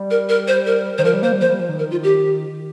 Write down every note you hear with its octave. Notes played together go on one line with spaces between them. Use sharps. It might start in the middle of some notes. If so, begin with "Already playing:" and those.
Already playing: G3
A#4
A#4
C5
A#4
D#3 C5
F3 A#4
G3
A#3 C5
G3
F3 C5
G3
F3
D#3
A#4
F4
G4